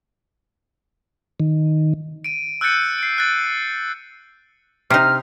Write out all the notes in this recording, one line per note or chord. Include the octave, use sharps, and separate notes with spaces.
D#3
D7 D#7
E6 F#6 G6 A6 C#7 D#7
C7 D7
F#6 A6 D7
C3 D#4 F6